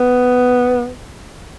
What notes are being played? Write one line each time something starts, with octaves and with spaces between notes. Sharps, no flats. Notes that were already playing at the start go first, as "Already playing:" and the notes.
Already playing: B3